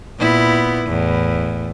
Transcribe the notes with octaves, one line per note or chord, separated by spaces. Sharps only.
A#2 B3 E4
E2 A2